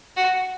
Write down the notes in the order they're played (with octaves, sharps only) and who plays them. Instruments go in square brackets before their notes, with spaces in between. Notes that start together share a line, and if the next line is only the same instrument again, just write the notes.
[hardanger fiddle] F#4